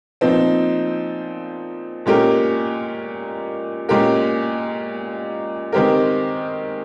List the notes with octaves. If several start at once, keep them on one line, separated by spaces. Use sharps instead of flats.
A#2 F3 C4 D#4
A#2 G#3 C#4 G4 A#4
A#2 G#3 C#4 G4 A#4
D#3 G#3 C4 G4 A#4